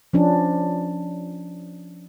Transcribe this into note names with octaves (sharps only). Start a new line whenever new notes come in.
F3 C#4 D4